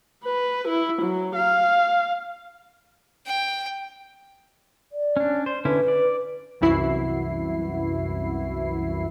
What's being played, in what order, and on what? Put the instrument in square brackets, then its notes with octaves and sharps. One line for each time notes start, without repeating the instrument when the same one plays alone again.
[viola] B4
E4
F#3
F5
[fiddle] G5
[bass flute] D5
[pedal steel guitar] C#4 D4
C5
[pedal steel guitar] D3 C#4 E4 [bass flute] B4
[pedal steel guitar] D5
[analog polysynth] C2 F#2 E3 E4 F#4 C7